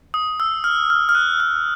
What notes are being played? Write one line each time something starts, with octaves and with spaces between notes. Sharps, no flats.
D#6
E6
F6
F6
F6
F#6
F6